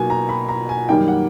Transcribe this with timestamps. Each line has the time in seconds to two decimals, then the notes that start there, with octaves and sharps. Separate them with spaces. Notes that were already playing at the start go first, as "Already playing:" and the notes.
Already playing: B2 F#3 A#3 D#4 G#5
0.10 A#5
0.29 B5
0.49 A#5
0.69 G#5
0.89 F#2 D#3 G3 A#3 D#4 G5
1.08 F#5